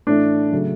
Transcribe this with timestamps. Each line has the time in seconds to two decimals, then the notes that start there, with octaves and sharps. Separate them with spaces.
0.07 A2 E3 A3 D4
0.52 C#3 F#3 A3